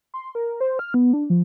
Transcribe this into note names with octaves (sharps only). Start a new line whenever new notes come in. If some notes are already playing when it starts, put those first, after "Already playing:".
C6
A#4
C5
F6
B3
D4
F3